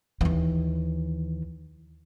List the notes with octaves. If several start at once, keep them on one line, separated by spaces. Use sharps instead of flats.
D#2 E3